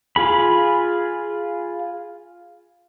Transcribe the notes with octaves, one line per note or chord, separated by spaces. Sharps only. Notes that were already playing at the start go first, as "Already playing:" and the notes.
F4 G#4 B5